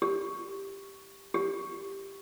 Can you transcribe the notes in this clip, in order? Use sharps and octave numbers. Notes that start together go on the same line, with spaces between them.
G4
G4